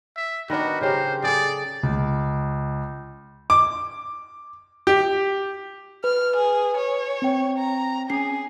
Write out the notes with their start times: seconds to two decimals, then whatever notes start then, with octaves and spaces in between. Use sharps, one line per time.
0.17 E5
0.50 D#3 B3 D4 F#4
0.81 C#3 G4 A#4 C5
1.23 G#4 A4 D5
1.83 C#2
3.50 D6
4.87 G4
6.04 B4 F6
6.37 G#4
6.77 C#5
7.22 C4 G5
7.59 A#5
8.10 C#4 G#4 C7